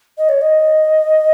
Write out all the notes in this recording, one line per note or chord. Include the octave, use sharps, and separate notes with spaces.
D#5
C#5
D#5